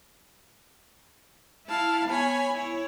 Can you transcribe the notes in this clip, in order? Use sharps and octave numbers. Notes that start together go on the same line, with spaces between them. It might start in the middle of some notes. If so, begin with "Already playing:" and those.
E4 F5 A5
B3 C#5 G#5 B5
E4 C#5